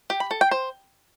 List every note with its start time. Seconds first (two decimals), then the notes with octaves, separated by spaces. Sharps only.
0.10 G4
0.20 B5
0.31 A4
0.41 G5
0.51 C5